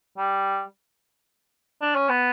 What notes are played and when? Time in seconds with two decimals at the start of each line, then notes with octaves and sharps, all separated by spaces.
0.18 G3
1.82 D4
1.95 C#4
2.09 B3